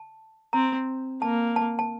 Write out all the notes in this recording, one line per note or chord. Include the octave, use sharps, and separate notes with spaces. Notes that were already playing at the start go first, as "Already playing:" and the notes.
Already playing: A5
C4 A#5
A#3 A5
A5
A5